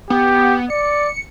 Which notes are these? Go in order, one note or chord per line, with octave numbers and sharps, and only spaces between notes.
B3 G4
D5 C#7